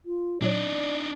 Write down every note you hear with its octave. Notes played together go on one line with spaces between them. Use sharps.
F4
A#2 F#3 D4 D#4 D5